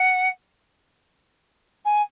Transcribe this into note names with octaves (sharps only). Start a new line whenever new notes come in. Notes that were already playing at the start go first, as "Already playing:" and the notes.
Already playing: F#5
G#5